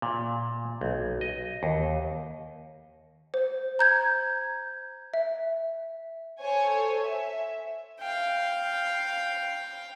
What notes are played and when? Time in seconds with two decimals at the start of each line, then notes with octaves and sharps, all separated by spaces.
0.02 A#2
0.81 B1
1.21 D#5
1.63 D#2
3.34 C5
3.79 A#5 G6 G#6
5.14 E5
6.40 A4 C5 C#5 G#5
7.03 E5
8.00 F5 G5